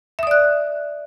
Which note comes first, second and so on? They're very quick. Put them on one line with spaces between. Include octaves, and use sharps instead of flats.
E5 D#6 D5 F#6